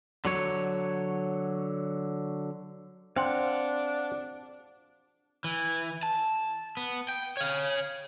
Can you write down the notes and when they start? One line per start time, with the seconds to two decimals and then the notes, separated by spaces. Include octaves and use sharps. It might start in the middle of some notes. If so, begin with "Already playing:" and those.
0.25 D3 F#3 C#5
3.16 C4 D4 F5 F#5
5.44 E3
6.03 A5
6.77 B3
7.09 G5
7.37 C#5 F5